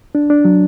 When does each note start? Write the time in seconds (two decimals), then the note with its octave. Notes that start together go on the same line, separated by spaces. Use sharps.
0.15 D4
0.30 D4
0.45 F#3